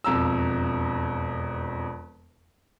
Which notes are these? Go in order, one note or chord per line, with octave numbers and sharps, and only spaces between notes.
E1 F2 A#5 E6